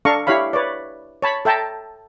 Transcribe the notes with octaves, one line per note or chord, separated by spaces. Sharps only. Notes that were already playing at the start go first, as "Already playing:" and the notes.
D4 A4 F5 A#5 C#6
E4 G4 C#5 F5 B5
B4 C#5 D5
C#5 A5 B5
A4 E5 G5 A5 A#5